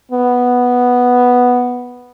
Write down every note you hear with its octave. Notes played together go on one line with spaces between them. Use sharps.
B3